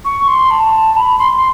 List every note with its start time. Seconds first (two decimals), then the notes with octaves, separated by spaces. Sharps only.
0.05 C#6
0.28 C6
0.51 A5
0.96 B5
1.19 C6